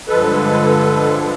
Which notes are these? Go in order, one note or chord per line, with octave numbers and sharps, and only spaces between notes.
G2 D3 F3 G#3 A4 B4